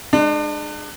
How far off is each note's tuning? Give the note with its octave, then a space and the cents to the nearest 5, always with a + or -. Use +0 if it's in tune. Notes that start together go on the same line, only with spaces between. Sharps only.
G#3 +0 D4 +35